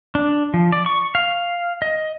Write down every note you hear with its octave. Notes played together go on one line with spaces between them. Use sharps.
D4
F3
D5
C#6
F5
D#5